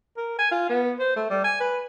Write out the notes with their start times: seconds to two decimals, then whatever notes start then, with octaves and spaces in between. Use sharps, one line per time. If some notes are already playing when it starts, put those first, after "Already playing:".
0.17 A#4
0.39 G#5
0.51 F4
0.69 B3
1.00 C5
1.16 A3
1.30 G3
1.44 G#5
1.60 B4